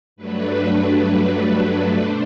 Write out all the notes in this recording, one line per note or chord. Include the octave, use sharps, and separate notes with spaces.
G2 F#3 A3 D4 B4
B2 A3 D4 C5